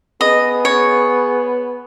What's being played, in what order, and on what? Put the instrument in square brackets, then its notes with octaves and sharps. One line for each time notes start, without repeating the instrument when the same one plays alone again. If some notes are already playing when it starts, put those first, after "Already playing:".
[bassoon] B3 [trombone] G#4 [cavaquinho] D#5
[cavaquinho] C#5